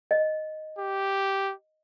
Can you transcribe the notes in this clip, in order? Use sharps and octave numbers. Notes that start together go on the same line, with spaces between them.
D#5
G4